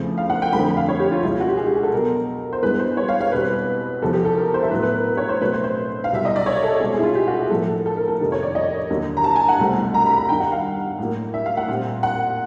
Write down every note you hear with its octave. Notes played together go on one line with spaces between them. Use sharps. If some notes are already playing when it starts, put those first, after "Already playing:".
Already playing: E2 C#3 F3 A3 C4
F5
F#5
G5
F2 D3 F3 A3 C4 B5
B5
F5
C#5
G4
F4
C#2 B2 G#3 E4
F4
F#4
G4
G#4
G4
G#4
A4
B2 F#3 B3 A#4
C5
G2 E3 G#3 B3 B4
C5
C#5
F5
F5
E2 B2 G3 C4 B4
E2 C3 F3 A4
G4
A4
A#4
C5
E5
A2 F#3 B3 B4
B4
A#4
B4
C#5
C5
B2 F#3 A3 C4 B4
C5
C5
F5
C2 B2 F#3 E5
D#5
D5
C#5
A4
B2 G#3 C4 G#4
G#4
E4
F4
G4
F#4
G#4
A2 F3 A#3 A4
A4
A4
A#4
A4
F2 C3 D#3 A#4
C#5
D5
D#5
D#2 D3 F#3 A#3
A#5
A5
G#5
F#5
C2 B2 F#3 A3 C4
A#5
B5
A#5
G2 D#3 G3 G5
F#5
F5
A2 F#3 A#3
E5
F5
F#5
A#2 G3 C4
F#5